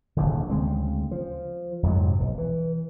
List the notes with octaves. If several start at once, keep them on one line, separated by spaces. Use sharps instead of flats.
D#1 A#1 D#2 D3
D2 C#3 G#3 C4
F3
F2 G#2 C3 F#3
B1
E3